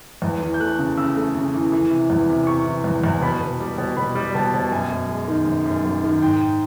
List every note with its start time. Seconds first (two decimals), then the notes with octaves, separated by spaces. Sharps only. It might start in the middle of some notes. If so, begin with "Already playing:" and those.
0.22 E2
0.41 E3
0.54 G6
0.60 A3 F#6
0.79 C#3
0.97 C#3 E6
1.16 A3
1.35 C#3
1.54 E3
1.72 E3
1.90 C3
2.10 E2
2.29 C3
2.47 C3 C#6
2.65 E3
2.84 E2
3.04 E2
3.22 B2 B5
3.41 B2
3.60 G3
3.78 B2
3.97 B2 B5
4.15 G3
4.34 B2 A5
4.54 B2
4.71 F#2 G#5
4.91 F#2
5.09 G#3
5.28 D#3
5.47 F#2
5.65 F#2
5.84 F#2
6.04 D#3
6.22 G#2 G5